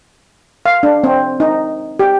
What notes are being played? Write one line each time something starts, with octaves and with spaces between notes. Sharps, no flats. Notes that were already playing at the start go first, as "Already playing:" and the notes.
F5
D4
C4
D#4
G4